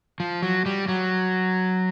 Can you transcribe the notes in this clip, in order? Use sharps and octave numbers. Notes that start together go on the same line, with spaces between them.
F3
F#3
G3
F#3